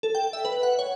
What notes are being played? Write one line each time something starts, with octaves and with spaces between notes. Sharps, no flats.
A4
G5
E5
B4
F#5
C#5